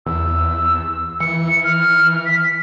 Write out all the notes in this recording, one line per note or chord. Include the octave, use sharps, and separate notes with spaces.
E2 E6
E3 C#7
F6
B6